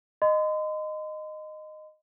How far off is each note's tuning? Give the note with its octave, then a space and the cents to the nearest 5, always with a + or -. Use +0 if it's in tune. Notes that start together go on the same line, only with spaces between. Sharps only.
D#5 -10 C6 -40